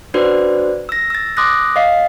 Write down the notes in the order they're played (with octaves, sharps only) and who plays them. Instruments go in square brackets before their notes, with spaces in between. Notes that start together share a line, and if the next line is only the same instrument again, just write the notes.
[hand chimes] D4 F#4 B4 C5 D5
E6 A#6
E6 A6
C6 D6 D#6 F#6 A#6
D#5 F5 C7